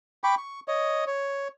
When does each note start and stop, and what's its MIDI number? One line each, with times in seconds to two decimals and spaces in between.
0.24 0.35 79
0.24 0.35 83
0.24 0.35 85
0.24 0.35 86
0.38 0.60 85
0.68 1.04 73
0.68 1.04 75
1.07 1.48 73